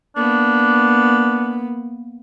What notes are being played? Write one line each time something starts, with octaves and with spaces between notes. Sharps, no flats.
A#3 B3 D4